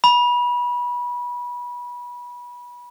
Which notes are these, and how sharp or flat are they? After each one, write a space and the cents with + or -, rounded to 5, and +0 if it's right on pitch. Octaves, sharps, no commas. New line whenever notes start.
B5 -25